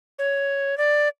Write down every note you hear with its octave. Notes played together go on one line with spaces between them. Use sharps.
C#5
D5